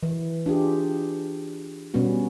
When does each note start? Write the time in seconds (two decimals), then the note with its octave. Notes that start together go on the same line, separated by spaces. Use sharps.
0.03 E3
0.46 D4 F4 G4 G#4
1.94 B2 G3 B3 C#4 F#4